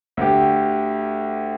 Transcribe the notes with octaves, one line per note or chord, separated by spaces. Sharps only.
D2 G4